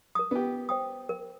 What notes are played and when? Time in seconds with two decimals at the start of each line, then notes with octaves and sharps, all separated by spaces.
0.15 A#4 D#6
0.31 B3 G4
0.69 C5 G5 D#6
1.09 A#4